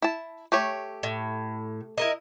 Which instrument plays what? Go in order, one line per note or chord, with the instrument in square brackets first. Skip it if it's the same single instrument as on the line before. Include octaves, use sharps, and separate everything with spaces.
[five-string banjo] E4 A5
A3 G4 C#5
[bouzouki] A2
E4 A#4 D#5